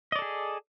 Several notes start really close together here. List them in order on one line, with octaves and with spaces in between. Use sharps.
D#5 D5 A4 G#4